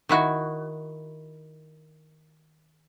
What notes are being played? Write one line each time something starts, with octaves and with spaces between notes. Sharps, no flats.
D#3 E4 F#4